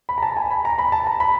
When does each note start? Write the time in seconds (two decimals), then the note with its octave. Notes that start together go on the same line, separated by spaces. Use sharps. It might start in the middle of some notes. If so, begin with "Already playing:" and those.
0.09 B5
0.18 A#5
0.23 A5
0.37 G#5
0.51 B5
0.65 A#5
0.78 B5
0.92 A5
1.07 A#5
1.20 B5